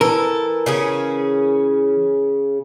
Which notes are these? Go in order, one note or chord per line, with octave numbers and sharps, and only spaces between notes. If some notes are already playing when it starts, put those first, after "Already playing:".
E3 A4 A#4
C#3 C#4 G#4